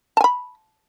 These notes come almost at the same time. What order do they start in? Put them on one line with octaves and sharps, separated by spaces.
A5 G#5 B5